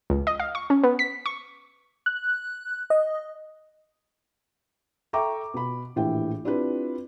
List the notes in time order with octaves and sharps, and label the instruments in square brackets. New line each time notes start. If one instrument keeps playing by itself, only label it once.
[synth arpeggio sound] C#2
D#5
F5
C#6
C#4
B3
B6
C#6
[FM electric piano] F#6
D#5
[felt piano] A4 E5 G5 A#5 C#6 D6
B2 B5
A#1 A2 E3 G4 G5
C4 D4 E4 F4 G4 B4